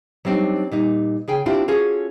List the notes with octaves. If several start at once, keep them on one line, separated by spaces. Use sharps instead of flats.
F#3 G3 C4 D4 D#4
A#2 G3 D#4
C#3 G#4 G5 G#5
C4 D4 E4 F4 G4
C#4 F4 F#4 G#4 A4